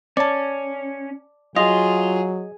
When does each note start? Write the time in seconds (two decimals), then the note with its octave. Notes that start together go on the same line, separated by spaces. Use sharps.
0.17 C#4 D5 A5
1.56 F#3 F4 G#4 D#5